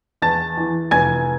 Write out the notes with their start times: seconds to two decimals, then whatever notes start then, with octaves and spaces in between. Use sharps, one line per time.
0.22 E2 A5 A6
0.57 E3
0.91 F1 G#5 G#6